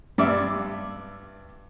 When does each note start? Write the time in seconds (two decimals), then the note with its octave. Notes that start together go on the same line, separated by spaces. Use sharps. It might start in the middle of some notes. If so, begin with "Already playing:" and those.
0.18 G2 D5 E5